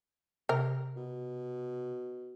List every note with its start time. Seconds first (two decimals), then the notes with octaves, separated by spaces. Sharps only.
0.49 C3 A#4
0.96 B2